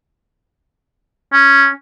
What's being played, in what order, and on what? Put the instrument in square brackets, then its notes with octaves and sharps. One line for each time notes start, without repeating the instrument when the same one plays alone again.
[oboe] C#4